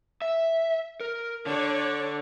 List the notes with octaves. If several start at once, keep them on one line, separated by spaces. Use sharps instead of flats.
E5
A#4
D3 D4 C#5 D5